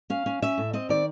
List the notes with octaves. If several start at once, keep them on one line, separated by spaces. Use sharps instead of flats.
C#4 F5
C#4
C#4 E5
A2
C4 D#5
D#3 D5